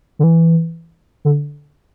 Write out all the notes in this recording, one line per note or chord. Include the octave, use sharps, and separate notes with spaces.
D3
E3
D3